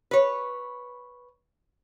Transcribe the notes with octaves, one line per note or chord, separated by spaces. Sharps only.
B4 C#5